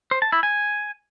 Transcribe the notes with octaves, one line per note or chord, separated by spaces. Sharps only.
C5
A5
E4
G#5